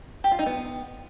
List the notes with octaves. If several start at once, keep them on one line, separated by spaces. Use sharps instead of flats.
G4
F4
D#4
B3